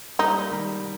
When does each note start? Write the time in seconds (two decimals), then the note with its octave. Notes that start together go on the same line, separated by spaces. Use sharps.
0.19 G3 A#3 D#4
0.51 D#3 G3